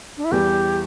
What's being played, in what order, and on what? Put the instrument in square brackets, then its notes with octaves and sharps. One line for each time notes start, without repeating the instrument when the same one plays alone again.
[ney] D4
E4
[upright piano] E2 E3 G3 [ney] G4